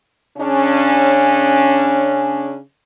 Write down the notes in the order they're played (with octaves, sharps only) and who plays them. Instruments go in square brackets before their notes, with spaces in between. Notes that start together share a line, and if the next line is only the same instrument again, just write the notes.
[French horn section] C#3 C#4 D4